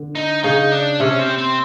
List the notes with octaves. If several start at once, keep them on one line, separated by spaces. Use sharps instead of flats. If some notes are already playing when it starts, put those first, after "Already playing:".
Already playing: D3
D#4
C#3 D#4
D4
C3 C#4
C4
C4